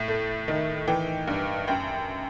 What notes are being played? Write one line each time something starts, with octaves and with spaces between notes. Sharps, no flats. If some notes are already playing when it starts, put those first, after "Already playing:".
Already playing: A2
A3
D#3
E3 G5
G2
F#2 G5